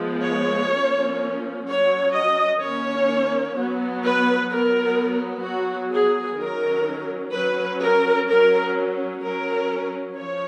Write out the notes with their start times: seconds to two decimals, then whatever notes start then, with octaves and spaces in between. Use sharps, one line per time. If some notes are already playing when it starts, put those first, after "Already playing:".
Already playing: F3 G#3 B3
0.24 C#5
0.72 F3 A#3 C#4
1.66 F#3 C#4 C#5
2.13 D#5
2.60 D#3 A#3 C#4 C#5
3.55 F#3 B3
4.02 B4
4.49 F#3 B3 A#4
5.44 F#3 B3 F#4
5.92 G#4
6.38 D#3 F#3 C#4 A#4
7.33 F#3 C#4 B4
7.80 A#4
8.27 F#3 C#4 A#4
9.22 F#3 C#4 A#4
10.16 F3 C#5